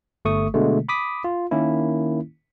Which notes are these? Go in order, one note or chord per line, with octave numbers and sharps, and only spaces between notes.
G1 A3 C#6 D#6
B2 D3 G#3 A3
B5 D6 D#6 B6
F4
D#3 A#3 C#4 E4